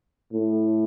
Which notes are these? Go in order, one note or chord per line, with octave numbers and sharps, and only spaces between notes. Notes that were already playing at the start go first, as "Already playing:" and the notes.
A2